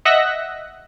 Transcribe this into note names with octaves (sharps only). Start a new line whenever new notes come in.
D#5 E5 F#5 E6 F#6 A#6